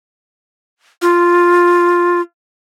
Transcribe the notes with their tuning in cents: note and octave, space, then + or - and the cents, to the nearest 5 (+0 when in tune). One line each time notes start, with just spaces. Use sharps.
F4 +5